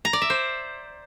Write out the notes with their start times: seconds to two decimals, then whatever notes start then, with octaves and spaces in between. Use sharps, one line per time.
0.05 A#5
0.13 D5
0.22 E5
0.30 C5